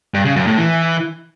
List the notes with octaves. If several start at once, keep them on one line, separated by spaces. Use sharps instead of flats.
G2
C#3
F#2
A2
E3